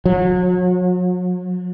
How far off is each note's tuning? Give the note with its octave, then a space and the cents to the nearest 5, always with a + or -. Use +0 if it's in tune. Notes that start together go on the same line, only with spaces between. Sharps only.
F#3 -40